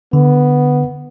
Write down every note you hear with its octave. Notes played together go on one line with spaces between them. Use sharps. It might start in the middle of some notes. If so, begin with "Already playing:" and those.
D3 B3